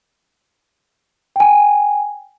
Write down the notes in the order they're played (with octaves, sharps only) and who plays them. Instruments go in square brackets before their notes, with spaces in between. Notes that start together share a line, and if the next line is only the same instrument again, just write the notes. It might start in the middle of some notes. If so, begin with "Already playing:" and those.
[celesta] G5 G#5